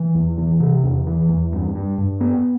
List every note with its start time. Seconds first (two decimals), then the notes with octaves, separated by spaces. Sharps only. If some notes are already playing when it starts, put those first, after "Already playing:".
Already playing: E3
0.15 E2
0.38 E3
0.60 C3
0.83 E2
1.07 E3
1.29 E2
1.52 G2
1.75 G2
1.98 G2
2.21 B3